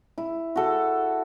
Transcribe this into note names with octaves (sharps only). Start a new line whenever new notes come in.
E4
F#4 A4